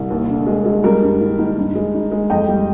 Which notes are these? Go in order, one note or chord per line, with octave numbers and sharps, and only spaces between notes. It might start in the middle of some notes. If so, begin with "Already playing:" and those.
Already playing: C2
D#2
D3
G#3
G#3
G3 A#4
G2
D#3
D#3
G2
G#3
D#4
G#3
F2 D#5 G5
G3